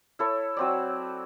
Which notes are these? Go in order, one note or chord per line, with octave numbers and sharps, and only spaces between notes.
E4 A4 C#5
F#3 C4 D5